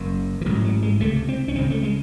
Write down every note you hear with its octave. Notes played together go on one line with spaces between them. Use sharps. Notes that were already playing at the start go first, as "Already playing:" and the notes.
Already playing: F#1 F#2 C#3
E3
A1 G#2 F#3
F#3
G#3
C#2 C3 A3
C4
C#4
C#2 C#3 C4
A3
G#3